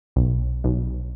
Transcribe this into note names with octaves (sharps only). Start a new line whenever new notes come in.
B1
B1